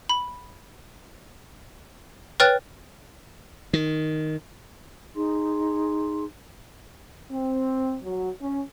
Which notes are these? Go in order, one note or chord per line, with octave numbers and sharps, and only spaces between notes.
B5
B4 C#5 G5 F6 F#6 A6
D#3
D#4 G#4 C6
C4
F#3
C#4